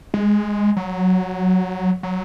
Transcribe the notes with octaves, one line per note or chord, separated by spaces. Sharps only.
G#3
F#3
F#3